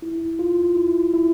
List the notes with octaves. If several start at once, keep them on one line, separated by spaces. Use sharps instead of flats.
E4
F4
E4
E4